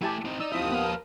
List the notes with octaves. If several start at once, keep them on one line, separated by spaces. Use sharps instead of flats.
A3 E4 G4 G#5 A5
C4 D#4
D#4 D5 E6
D#2 F3 C4 D#4 E4 E5 D#6
B3 B4 F5
A#4